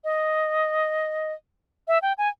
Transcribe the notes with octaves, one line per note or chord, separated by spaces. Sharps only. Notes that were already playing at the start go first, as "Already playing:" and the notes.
D#5
E5
G5
G#5